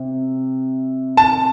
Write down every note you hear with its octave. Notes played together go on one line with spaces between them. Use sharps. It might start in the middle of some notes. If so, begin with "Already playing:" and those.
Already playing: C3
A5